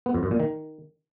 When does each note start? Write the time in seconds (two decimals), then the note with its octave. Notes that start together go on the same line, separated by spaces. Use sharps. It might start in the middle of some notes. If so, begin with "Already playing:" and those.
0.06 B3
0.14 F2
0.23 F#2
0.31 A#2
0.40 D#3